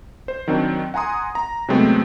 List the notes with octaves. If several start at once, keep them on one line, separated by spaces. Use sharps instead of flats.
C5
D#3 F#3 C4 D4
F#5 G#5 A#5 C6 D#6
A#5
C3 F#3 G#3 A3 B3 C4